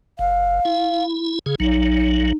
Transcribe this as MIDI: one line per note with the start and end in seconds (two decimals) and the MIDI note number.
0.19 0.60 30
0.19 1.04 77
0.65 1.39 64
1.46 1.55 49
1.46 1.55 68
1.60 2.32 34
1.60 2.32 54
1.60 2.35 63